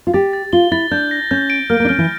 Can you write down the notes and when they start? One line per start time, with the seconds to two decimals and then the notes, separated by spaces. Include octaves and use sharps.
0.07 F4
0.14 G4 A6
0.33 A6
0.53 F4 G7
0.72 E4 A6
0.91 D4 G6
1.11 A#6
1.31 C#4 G6
1.50 D7
1.70 A#3 F6
1.80 A#3
1.85 D4
1.89 C#4 F6
1.98 E3